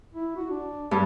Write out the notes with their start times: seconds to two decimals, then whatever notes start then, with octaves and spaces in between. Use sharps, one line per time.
0.14 E4
0.36 F#4
0.50 D4
0.91 G2